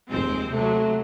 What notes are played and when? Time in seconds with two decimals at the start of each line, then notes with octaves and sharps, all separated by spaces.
0.10 F1 D#2 G#3 C4
0.53 C3 F#3 A3